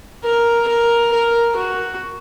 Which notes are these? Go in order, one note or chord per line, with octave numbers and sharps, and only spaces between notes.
A#4
A#4
A#4
F#4